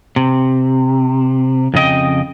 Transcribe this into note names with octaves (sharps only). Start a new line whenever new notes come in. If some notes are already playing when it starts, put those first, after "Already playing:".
C3
F2 C#3 D#5 G5